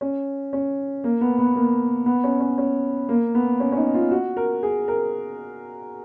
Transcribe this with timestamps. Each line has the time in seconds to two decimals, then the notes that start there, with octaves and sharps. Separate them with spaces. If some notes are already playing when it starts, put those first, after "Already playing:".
0.01 C#4
0.53 C#4
1.04 A#3
1.21 B3
1.38 B3
1.55 A#3
2.06 B3
2.24 C#4
2.40 C#4
2.58 C#4
3.09 A#3
3.35 B3
3.60 C#4
3.72 C#4
3.77 D#4
3.94 F4
4.11 F#4
4.37 A#4
4.63 G#4
4.88 A#4